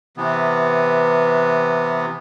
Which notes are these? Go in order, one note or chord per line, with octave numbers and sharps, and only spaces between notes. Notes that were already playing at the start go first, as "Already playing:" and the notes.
C3 E3 B3